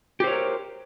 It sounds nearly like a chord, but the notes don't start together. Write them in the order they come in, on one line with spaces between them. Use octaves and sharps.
G4 C5 C#5 A#4